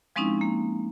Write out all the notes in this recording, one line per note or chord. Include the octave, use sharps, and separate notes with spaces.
F3 G#3 C4 C#4 D#4 E4
A#3